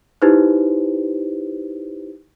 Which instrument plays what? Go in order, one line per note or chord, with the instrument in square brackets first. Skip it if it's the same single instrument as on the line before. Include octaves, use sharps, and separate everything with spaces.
[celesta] D#4 E4 G4 B4 C5